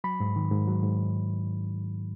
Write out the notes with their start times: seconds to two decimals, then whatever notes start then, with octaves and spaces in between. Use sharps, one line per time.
0.04 F#3 B5
0.20 G#2
0.36 D#3
0.51 G#2
0.67 F#3
0.83 G#2